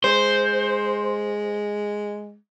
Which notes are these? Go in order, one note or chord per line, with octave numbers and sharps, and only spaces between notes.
G#3 C5